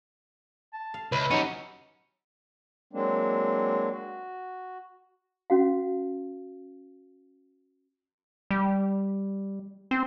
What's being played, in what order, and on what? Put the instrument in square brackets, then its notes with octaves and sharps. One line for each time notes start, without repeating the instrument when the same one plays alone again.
[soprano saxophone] A5
[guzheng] F5
[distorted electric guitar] C#2 [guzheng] E4 [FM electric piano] B4
[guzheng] F#3 [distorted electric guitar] C#4 G4 [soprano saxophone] D#4
[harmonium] F#3 G#3 A#3 C4 D4
F#4
[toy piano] C#4 F#4 F5
[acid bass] G3
C4